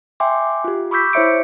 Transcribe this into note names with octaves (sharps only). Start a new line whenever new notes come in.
E5 G5 G#5 C6 D6
F4 G4
B5 C#6 D6 E6 G6 B6
E4 C5 C#5 E5 C#7 D7